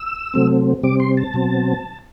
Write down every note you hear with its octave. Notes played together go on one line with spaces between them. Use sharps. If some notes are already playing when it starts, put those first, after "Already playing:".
Already playing: E6
C3 F#3 A3 C4
C3 G3 C4 D6
C6
A5
B2 F#3 C4